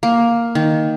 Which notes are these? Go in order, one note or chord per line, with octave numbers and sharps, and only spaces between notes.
A#3
D#3